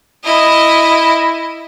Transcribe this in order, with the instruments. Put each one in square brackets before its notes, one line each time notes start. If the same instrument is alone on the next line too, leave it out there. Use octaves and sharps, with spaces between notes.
[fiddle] E4 D#5